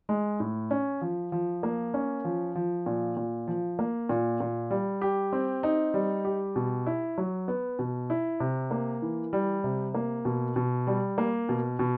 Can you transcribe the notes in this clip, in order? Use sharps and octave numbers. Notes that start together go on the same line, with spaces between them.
G#3
A2
C#4
F3
F3
A#3
C#4
F3
F3
A#2
A#2
F3
A#3
A#2
A#2
G3
G4
C4
D#4
G3
G4
B2
E4
F#3
B3
B2
E4
C3
A#3
E3
G3
C3
A#3
B2
B2
G3
A#3
B2
B2